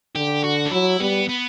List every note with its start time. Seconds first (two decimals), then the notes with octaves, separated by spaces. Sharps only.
0.16 D3 G4
0.44 F#4
0.65 D4
0.71 F#3 E4
1.00 G3 B3
1.29 B3